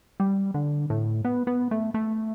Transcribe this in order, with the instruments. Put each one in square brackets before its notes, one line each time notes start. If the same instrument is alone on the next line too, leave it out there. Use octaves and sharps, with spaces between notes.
[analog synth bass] G3
D3
A2
B3
B3
A3
A3